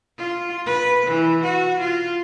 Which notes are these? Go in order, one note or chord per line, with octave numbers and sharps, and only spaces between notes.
F4
B4
E3
F#4
F4